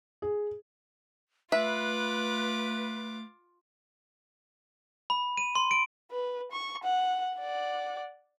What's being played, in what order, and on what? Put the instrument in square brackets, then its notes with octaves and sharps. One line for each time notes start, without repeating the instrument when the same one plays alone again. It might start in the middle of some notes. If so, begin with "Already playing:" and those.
[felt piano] G#4
[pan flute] A3 [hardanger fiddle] F4 D6 [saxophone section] B4 [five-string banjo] E5
[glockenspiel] B5
D#7
C6
D7
[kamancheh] B4
C#6
F#5
D5 F#5